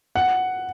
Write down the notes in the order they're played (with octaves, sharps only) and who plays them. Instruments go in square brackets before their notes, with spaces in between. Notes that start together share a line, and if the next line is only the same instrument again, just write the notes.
[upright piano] F#5